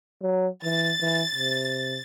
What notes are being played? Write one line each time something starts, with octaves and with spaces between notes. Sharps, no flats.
F#3
E3 A6
E3
C3